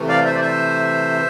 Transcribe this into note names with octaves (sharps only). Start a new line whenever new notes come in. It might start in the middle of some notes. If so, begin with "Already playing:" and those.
Already playing: C3 E3 A3
D5 F5
C5 E5
D5
C5 E5